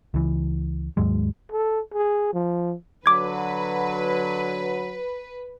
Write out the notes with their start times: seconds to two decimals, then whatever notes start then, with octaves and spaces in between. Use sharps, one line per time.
0.14 C#2 E3
0.97 D#2 G#2 F#3 G#3
1.52 A4
1.94 G#4
2.34 F3
3.06 D3 F#3 B4 D6 G#6